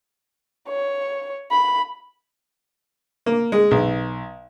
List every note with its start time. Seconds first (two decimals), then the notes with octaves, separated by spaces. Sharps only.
0.69 C#5
1.51 B5
3.26 A#3
3.52 G#3
3.71 B1